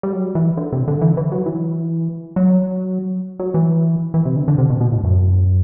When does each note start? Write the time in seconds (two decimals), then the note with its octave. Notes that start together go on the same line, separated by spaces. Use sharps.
0.03 G3
0.13 F#3
0.35 E3
0.57 D3
0.73 C3
0.88 D3
1.01 E3
1.17 E3
1.32 F#3
1.46 E3
2.36 F#3
3.39 F#3
3.54 E3
4.14 E3
4.25 C3
4.36 D3
4.48 D3
4.58 C3
4.70 B2
4.81 B2
4.92 A2
5.04 F#2